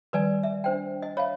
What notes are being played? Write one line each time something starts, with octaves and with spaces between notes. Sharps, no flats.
D#3 F3 G3 B4 D5 G#5
E5
D4 C5 G5
D#5
C#5 E5 F5 B5